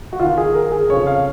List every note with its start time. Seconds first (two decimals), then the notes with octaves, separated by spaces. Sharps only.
0.13 F#4
0.19 D#2 D#3 F4
0.38 G#4
0.54 A#4
0.72 G#4
0.89 F2 C#3 F3 C#5
1.07 F5